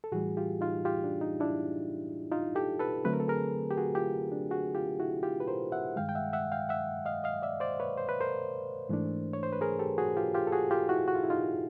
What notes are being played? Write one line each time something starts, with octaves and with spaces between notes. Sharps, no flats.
A4
A2 E3 G3 F#4 G#4
F4 G4
D#4 F4
F4 G4
D4
D#4
D4 E4
D#4 F4
G4 A4
A4 B4
D3 F#3 A3 C4 B4
A#4
A4
G#4 A#4
G4
F#4 G#4
F4 G4
D4
F#4 G#4
F4 G4
E4 F#4
F4 G4
B4
A#4 C5
E5 F#5
G2 D#3 G#3 F5 G5
G5
E5 F#5
E5 F#5
F5 G5
E5 F#5
D#5 F5
D#5 F5
D5 E5
C5 D5
B4 C#5
C5
B4
A#4 C5
G#2 E3 A3 D4
C#5
C5
B4
G#4 A#4
G4 A4
F#4 G#4
F4 G4
F4 G4
A4
F#4 G#4
F4 G4
E4 F#4
F#4
F4
E4
D#4 F4